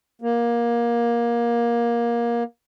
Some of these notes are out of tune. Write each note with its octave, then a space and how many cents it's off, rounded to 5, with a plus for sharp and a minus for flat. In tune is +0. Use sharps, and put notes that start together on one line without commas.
A#3 +20